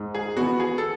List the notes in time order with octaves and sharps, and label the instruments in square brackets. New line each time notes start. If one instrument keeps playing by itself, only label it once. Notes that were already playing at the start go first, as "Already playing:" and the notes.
Already playing: [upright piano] G#2
[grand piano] G#4
[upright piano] E3 B3 [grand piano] F#4
[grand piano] G#4
A4